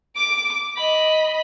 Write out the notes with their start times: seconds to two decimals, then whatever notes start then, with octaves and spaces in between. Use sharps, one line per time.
0.16 D6 D7
0.77 D#5 B5